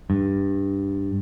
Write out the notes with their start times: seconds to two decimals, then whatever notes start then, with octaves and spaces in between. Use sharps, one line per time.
0.10 G2